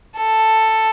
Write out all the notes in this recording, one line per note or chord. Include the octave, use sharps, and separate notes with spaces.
A4